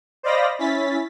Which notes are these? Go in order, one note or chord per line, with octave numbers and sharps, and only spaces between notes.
C5 D5 D#5 F5 B5 A#6
C#4 E4 A6 B6